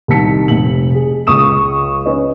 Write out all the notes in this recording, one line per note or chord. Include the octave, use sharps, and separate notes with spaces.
C2 D#3 C4 A5 B6 C#7
F1 F#7
G#4
C#2 C#6 D#6 E7
C#4 B4 D#5